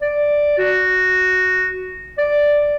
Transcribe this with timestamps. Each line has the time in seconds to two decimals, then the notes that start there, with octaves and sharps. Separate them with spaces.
0.02 D5
0.58 F#4
2.18 D5